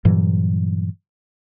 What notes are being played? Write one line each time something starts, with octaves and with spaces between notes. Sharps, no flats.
G2 A#2 E3 F#3